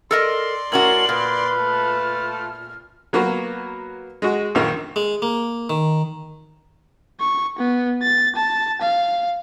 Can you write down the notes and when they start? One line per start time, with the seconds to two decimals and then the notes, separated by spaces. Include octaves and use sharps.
0.11 A4 A#4 D5 D#5 C6
0.72 A2 C#4 F#4 A#4 F#7
1.09 A#2 B4 F6
1.58 A3 F4 A5
3.13 F#3 A#3 B3 F#4 B4
4.22 G#3 F#4
4.55 A#1 F#2 D#3 A#3
4.96 G#3
5.22 A#3
5.70 D#3
7.20 C#6
7.58 B3
8.02 A6
8.35 A5
8.81 F5